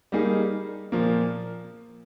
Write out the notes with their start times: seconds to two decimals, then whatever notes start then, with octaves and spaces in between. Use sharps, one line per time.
0.12 G3 A#3 D#4 G#4
0.92 A#2 F3 A#3